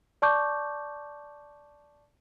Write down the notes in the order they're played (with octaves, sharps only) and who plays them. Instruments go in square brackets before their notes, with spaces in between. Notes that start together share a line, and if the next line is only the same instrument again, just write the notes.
[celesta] D5 A5 C#6 D6 G6